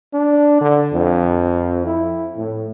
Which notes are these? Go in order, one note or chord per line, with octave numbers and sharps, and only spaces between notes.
D4
D3
F2
E4
A2